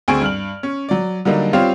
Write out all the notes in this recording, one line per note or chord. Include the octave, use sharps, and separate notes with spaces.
D2 C4 G#4 G#5 C#6 D7
G2 F6 F#7
C#4
F#3 D5
D3 F#3 G3 A#3 D4 D#4
G3 C4 F4 G4 C#5 F5